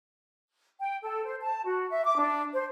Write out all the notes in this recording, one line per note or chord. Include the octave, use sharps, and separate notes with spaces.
G5
A4
C5
A5
F#4
E5
D6
D4
C5